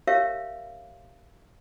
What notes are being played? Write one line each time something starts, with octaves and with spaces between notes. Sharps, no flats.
G4 A#4 C#5 E5 F5